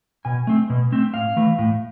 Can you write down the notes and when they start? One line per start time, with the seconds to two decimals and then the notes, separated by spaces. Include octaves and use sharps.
0.25 B2 G#5
0.47 A3 C4
0.70 B2
0.92 A3 C4
1.14 A2 F5
1.36 E3 A3
1.59 A2